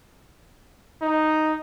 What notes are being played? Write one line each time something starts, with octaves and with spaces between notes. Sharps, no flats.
D#4